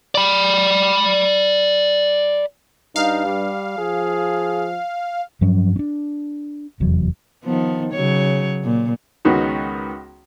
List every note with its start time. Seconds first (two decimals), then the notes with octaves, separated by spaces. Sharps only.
0.15 D5 B5
2.96 G2 D#4 F5
3.26 G3
3.78 F3 G#4
5.41 G2 F3 F#3 C#4
5.76 C#4 D4
6.80 F1 E2 F#3
7.44 D#3 F3 B3
7.92 C#3 F#3 C#5
8.64 A#2
9.25 C#2 D#3 B3 D#4 F#4